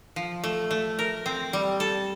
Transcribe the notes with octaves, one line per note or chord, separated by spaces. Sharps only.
F3
A3
A3
A#4
C4
G3
A4